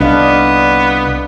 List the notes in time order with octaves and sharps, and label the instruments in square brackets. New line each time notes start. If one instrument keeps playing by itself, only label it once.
[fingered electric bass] C2 [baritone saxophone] B3 [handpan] D4 D#5 F5